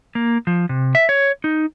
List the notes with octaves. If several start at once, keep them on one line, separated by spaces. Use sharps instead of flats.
A#3
F3
C3
E5
C#5
D#4